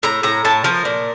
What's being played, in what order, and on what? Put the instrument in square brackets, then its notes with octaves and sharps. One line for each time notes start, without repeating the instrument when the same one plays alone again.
[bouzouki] A2 A#5
A2 A#5
A2 A5
F3 A#4
A#2